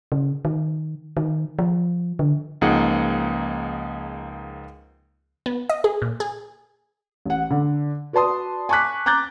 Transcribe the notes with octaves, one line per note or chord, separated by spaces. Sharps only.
C#3
D#3
D#3
F3
D3
C#2 F3 A#3 D#4 G#4 F#5
B3
D#5
G#4
A#2
G#4
A1 F#5
D3
F#4 B4 D5 A5 C6 D#6
G#5 A5 C#6 D6 F#6 B6
A#5 D6 F#6 G6 A6